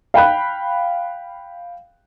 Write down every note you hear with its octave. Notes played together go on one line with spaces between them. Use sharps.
F5 G5 B5 F#6